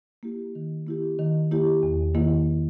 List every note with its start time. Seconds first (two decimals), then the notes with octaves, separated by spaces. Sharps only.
0.23 A#3 E4 G4
0.55 D#3
0.87 A#3 E4 G4
1.19 D#3
1.51 A#3 E4 G4
1.83 E2
2.15 D#3 A#3 E4